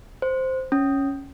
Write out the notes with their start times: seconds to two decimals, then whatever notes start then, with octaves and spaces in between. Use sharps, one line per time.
0.22 C5
0.72 C#4